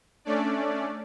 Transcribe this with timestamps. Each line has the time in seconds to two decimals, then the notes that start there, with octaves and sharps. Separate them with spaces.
0.25 A3 C#4 D4 D5